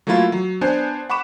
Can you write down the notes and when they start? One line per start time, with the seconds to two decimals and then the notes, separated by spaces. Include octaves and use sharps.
0.07 F#3 A3 A#3 E4 F4
0.32 F#3
0.61 B3 D4 C5 G#5
1.10 F#5 B5 C#6 D6 E7